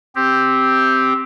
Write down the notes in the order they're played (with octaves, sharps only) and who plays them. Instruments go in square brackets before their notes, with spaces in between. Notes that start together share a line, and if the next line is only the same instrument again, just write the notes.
[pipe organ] C4 G4